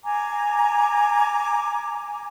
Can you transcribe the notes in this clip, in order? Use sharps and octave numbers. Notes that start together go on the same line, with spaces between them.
G#5 A#5 D6